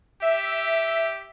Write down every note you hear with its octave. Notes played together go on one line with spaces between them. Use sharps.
G4 E5